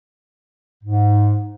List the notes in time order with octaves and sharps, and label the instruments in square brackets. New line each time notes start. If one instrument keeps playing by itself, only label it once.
[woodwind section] G#2